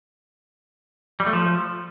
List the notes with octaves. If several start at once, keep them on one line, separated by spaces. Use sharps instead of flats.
G3
A3
F3